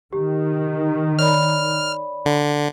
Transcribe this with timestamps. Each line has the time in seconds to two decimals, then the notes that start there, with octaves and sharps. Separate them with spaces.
0.13 D#3 G4
1.19 C#5 D5 B5 F6
2.26 D3